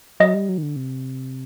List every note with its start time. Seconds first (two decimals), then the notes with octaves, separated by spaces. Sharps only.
0.20 F#3 D#5
0.34 G3
0.49 F#3
0.58 D#3
0.63 D3
0.76 C3